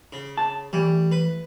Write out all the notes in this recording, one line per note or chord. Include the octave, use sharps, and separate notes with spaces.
C#3
A5
E3 G3 A3
B4